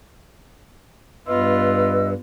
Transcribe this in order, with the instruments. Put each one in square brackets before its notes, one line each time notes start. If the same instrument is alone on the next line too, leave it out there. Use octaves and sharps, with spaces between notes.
[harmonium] G2 [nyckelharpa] B3 F4 [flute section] B4 D#5 E6